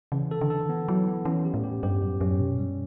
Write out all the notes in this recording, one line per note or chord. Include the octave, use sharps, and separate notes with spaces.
C#3 E3
A4
D3
A4
E3 B3
F#3 E4
B3
E3 C#4
G4
A2
G4
G2 G4
F#2 A2
F#2 C#4
B2 C#4
F#2 G3